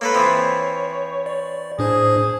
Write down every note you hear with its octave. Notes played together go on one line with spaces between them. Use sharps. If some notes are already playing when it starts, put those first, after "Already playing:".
A#3 A4 B4 C#5
E3 F3 C4
D5
A2 D4 G#4 C5